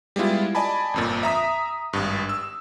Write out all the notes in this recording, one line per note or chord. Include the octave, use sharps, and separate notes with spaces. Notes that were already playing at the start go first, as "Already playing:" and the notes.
G3 G#3 B3 E4 F4
D5 D#5 G#5 A5 B5
G1 F2 A#2
E5 A#5 D#6 B6
G#1 G2
E6